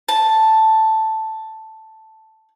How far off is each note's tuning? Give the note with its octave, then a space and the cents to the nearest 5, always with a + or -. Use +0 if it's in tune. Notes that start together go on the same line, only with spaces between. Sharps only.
A5 +0